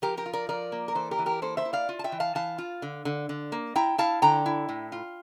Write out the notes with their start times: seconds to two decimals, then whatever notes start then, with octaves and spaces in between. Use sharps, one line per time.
0.02 F3 G4 A#4
0.17 G4 A#4
0.26 F4
0.33 A#4 D5
0.49 F3 A#4 D5
0.72 A#3
0.88 A#4
0.95 E3 A4 C5
1.11 G4 A#4
1.19 E3
1.26 G4 A#4
1.42 A#3 A4 C5
1.57 C5 E5
1.65 E4
1.73 D5 F5
1.89 F4
1.99 A5
2.04 E5 G5
2.12 E3
2.20 F5 A5
2.35 E3 F5 A5
2.58 F4
2.82 D3
3.05 D3
3.29 D3
3.52 A#3
3.76 E4 G5 A#5
3.98 E4 F5 A5
4.22 D3 G5 A#5
4.46 E4
4.69 A2
4.92 F4